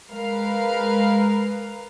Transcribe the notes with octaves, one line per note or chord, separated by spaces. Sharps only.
G#3 A#4 B4 F5